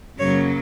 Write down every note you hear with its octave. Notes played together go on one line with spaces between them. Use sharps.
F#2 C#3 F#3 A#3 C#5